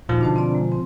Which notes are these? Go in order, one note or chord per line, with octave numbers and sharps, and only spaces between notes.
D#1 A#2 F3 D#4 F#4
B2 D3 D4 C5 A5
C4 D4 D5
G#3 A#5
C4